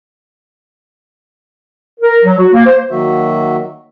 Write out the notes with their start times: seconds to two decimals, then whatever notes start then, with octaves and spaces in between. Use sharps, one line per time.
2.00 A#4
2.24 F#3
2.38 F#4
2.53 A#3
2.66 C5
2.91 D#3 F#3 A#3 F#4 E5